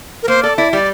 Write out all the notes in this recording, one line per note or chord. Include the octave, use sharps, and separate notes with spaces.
A#4
A#3 C5
A4 D5
E4 D5
G3 D5